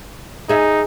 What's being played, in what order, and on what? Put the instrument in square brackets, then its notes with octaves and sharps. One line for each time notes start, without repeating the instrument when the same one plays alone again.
[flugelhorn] D#4 [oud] G#4 E5